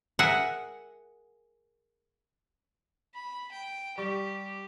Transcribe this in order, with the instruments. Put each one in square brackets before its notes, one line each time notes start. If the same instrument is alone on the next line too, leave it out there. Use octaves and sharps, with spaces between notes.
[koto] G#4 A#4 E5 F#5
[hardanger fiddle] B5
G5
[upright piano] G3 C#6 [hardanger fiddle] G4